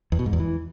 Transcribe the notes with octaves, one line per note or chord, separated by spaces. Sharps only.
E2
B2
G#2
E2
E3